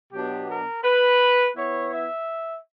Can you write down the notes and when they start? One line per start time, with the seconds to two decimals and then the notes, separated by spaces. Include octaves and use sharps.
0.12 B2 F#3 B3 D4 G4
0.48 A#4
0.84 B4
1.57 E3 B3 E4 C#5
1.93 E5